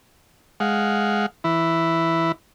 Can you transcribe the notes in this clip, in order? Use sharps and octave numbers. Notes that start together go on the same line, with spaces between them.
G#3 F5 F#5
E3 E4